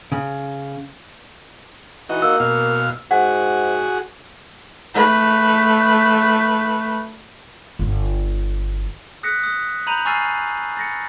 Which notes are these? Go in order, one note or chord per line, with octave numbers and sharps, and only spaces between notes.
C#3
E3 D#4 F#4
A#3 E6
B2 F5
G#2 F#4 G#4 F#5
A3 B4
G1
D#6 F#6 A#6 B6 C#7
D#6
A#5 B5 G6 D#7 F7 F#7
G#5 C#6 E6 F6 A6 C7
A6 A#6 C#7